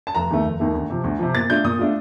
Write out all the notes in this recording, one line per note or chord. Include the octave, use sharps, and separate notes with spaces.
A5
F1 A#5
D#2 D#3 A3
F1
D#2 D#3 A3
D2
C3 F3
D2
C3 F3
A#2 A6
A3 D4 F4 G6
A#2 D#6
A3 D4 F4